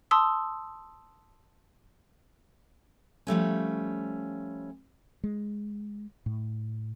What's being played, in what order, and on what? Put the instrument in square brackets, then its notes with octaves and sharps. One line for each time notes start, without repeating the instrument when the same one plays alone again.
[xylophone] A5 C6 D#6 E6
[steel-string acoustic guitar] F3 G3 A3 C#4
[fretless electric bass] G#3
A2